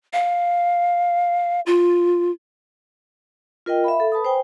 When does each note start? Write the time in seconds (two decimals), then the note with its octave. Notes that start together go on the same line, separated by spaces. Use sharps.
0.13 F5
1.66 F4
3.66 F4 A#4 D#5 G5
3.84 E5 F5 B5
4.00 A4
4.12 B4 A5 B5 D#6
4.25 C5 G5 G#5